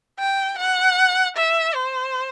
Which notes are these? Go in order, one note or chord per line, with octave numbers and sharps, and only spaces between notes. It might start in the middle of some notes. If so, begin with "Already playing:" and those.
G5
F#5
E5
C5